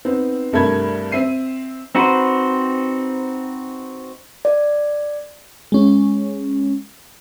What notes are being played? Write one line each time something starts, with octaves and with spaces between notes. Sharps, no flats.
B3 C4 D#4
C2 G2 A3 A#4 B5 G#6
C4 E5 C7 D#7
C4 D#4 F#4 B4 C5
D5
G#3 C#4